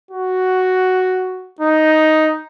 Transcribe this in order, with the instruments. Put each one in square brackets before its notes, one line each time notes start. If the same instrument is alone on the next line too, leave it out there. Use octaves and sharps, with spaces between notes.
[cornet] F#4
D#4